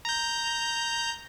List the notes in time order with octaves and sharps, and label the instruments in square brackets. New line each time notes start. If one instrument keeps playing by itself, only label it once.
[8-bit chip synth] A#5 G6